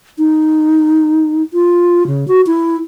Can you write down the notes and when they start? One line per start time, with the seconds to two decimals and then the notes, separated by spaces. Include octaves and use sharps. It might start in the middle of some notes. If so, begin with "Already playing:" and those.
0.18 D#4
1.53 F4
2.07 C#3
2.28 F#4
2.47 E4